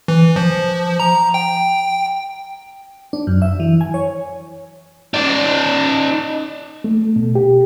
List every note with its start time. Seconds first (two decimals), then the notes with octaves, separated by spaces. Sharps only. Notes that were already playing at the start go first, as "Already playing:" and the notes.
0.08 E3
0.36 F3
1.00 A#5
1.34 G5
3.13 D4
3.27 F#2
3.42 E5
3.60 E3
3.81 G#5
3.94 C#5
5.14 D#4 D5
6.84 A3
7.16 B2
7.35 G4